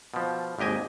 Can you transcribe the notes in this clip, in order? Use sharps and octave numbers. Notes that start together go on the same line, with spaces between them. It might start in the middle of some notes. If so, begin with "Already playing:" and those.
B2 F3
G#1 D#2 G4 D#5 G#5